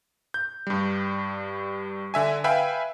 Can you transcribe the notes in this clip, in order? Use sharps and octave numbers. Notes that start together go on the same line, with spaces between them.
G6
G2 G3
D3 E5 G#5
B4 E5 F5 G5 G#5 B5